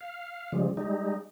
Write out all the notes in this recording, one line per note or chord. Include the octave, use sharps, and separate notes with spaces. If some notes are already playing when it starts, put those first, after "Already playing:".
F5
C#3 F3 G3 G#3
G3 G#3 D#4